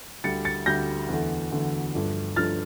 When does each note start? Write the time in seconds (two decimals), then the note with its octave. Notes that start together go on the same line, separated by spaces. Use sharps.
0.24 D2 D3 G3 A6 C#7
0.45 A6 C#7
0.66 D2 D3 G3 G6 A#6
1.09 E2 D3 A3
1.51 E2 D3 A3
1.94 G2 F3 A3 D4
2.36 G2 F3 A3 D4 F6 A6